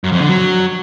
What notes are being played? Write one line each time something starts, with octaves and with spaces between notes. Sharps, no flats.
F#2
F2
D3
F#3